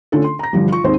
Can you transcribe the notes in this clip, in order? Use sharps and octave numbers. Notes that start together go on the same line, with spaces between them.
D3 A3 C#4 D4 F4 A4
C6
A#5 A#6
G2 D3 E3 F3 G3
F4 C#6
D#2 G#2 C4 C5 C6